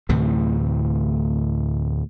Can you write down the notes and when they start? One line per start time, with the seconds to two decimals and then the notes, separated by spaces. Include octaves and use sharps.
0.09 D2 A2 C3 E3